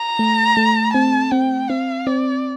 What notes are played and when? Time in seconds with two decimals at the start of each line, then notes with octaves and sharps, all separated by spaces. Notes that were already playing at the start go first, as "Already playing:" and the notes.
Already playing: A#5
0.19 A3
0.57 A3
0.94 C4 A5
1.32 C4 G5
1.69 C4 F5
2.07 C4 D5